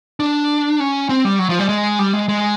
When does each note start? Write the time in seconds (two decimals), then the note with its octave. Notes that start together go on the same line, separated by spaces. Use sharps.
0.20 D4
0.80 C#4
1.09 C4
1.25 G3
1.39 F#3
1.49 F3
1.59 G3
1.69 G#3
1.99 G3
2.13 G#3
2.29 G#3